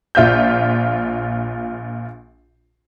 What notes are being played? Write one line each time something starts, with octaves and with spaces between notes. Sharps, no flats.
A#1 F4 E5 G6